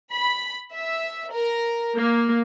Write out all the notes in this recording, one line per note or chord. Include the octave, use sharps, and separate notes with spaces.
B5
E5
A#4
A#3